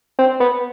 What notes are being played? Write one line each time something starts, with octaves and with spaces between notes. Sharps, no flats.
C4
B3